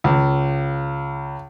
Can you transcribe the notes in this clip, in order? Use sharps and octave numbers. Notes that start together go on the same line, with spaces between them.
C#2